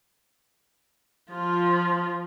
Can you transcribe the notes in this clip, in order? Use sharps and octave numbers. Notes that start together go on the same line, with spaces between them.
F3 F4